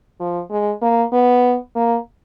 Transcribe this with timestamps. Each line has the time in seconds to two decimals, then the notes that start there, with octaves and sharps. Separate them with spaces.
0.20 F3
0.50 G#3
0.82 A#3
1.13 B3
1.76 A#3